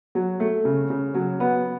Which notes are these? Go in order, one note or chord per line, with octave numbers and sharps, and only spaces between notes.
F#3
A3
C#3
C#3
F#3
B3